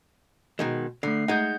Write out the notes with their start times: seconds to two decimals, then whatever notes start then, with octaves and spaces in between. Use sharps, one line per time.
0.59 B2 D#3 G#3
1.03 D3 A3 C7
1.28 G#3 D#4 F#5 G6